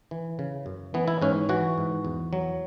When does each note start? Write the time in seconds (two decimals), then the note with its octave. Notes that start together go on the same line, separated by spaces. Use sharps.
0.11 E3
0.39 C#3
0.66 F#2
0.94 E3 B3
1.08 E4
1.22 G#2 C#4
1.49 E3 F#4
1.78 G#2
2.05 E2
2.33 F#3